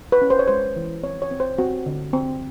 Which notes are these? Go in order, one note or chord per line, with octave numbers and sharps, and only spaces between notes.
B4
C#4
C5
C#5
G#3 C5
E3
C4 C#5
C#5
C4
C5
C4 F#4
D3
C4